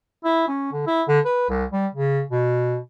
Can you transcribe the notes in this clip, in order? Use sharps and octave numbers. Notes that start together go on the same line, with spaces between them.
E4
C#4
D3
E4
D3
B4
C2
G3
C#3
B2